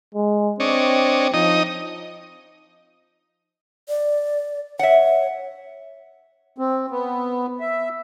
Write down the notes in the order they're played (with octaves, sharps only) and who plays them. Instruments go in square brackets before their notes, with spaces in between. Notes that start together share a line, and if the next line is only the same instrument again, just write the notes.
[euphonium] G#3
[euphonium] C4 [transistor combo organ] D4 C#5 D#5
[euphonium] F3 [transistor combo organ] D#4 D#5
[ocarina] D5
[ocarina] C#5 [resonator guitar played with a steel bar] E5 F#5
[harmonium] C4
B3
E5